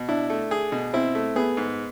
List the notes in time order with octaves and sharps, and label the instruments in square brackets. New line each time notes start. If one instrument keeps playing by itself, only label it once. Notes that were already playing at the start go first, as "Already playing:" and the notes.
Already playing: [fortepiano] B2
[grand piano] D4 [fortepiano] E4
[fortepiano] A3
G#4
B2
[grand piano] C4 [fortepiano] E4
[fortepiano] A3
[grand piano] B3 [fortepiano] G#4
[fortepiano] G#2